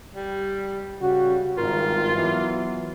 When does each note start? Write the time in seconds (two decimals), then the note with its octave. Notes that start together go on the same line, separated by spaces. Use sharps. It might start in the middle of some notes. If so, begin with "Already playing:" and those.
0.15 G3
1.01 C#3 G3 F#4
1.58 G#1 G2 F4 A#4
2.16 E3 F#3 B3